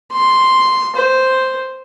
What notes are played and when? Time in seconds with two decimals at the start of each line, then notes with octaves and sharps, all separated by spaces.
0.12 C6
0.96 C5